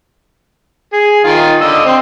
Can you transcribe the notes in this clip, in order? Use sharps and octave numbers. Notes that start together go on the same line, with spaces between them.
G#4
D#3 F4
D3 D#5 E6
C4